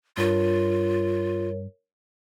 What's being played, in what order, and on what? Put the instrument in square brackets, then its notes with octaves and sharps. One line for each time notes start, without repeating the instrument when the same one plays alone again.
[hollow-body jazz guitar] G2 [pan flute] F4 [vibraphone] A#4 C#5